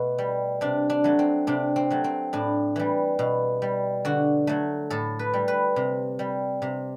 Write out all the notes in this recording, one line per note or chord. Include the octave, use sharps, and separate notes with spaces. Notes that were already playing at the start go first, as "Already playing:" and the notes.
Already playing: B2 A3
G3
C3 D4
D4
F#3 A3
C4
C3 D4
C4
F#3 A3
C4
A2 D4
E3 G3
B2
G3
D3 F#4
F#3 A3
A2 A4
B4
G3
B4
C3
G3
C3